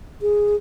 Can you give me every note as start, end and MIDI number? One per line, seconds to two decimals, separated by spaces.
0.22 0.56 68